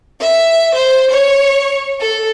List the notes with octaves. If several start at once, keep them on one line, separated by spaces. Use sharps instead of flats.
E5
C5
C#5
A4